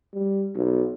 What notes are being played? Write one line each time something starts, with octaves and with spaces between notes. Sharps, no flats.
G3
B1